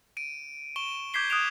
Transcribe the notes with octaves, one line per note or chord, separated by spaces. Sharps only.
D7 D#7
C#6 D7 E7 G7
D6 G6 G#6 B6 C7 G7
D#6 F#6 G#6 D7 E7 F7